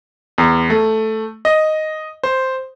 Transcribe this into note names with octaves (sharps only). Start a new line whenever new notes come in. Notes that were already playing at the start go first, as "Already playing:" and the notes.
E2
A3
D#5
C5